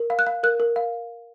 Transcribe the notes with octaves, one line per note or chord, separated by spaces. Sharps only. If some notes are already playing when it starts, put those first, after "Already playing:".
Already playing: A#4
F5
F#6
F5
A#4 F#6
A#4
F5